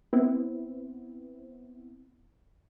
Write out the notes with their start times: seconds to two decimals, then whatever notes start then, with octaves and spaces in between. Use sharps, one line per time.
0.13 B3 C4 E4